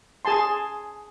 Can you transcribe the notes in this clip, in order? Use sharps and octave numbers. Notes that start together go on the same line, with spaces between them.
G#4 G#5 A5 C6